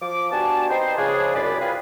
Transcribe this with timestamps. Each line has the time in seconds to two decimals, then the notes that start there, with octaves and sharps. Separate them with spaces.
0.02 F3 D6
0.32 B3 D4 F#4 G4 G#5 A5
0.70 C4 D#4 G4 B4 C5
0.97 C#3 F3 D4 G#4
1.35 C2 F#2 B4 D5
1.60 C4 F4 G#4 B4